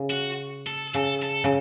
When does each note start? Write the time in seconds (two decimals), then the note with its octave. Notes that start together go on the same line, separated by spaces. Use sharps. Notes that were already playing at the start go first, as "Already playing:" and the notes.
Already playing: C#3
0.11 F#4
0.67 A4
0.94 C#3 A4
1.22 A4
1.44 C#3